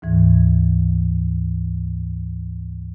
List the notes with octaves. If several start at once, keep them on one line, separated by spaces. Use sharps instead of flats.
D2 G#2 E3